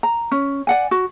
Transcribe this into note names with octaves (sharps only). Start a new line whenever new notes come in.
A#5
C#4
D5 F#5 G#5
F#4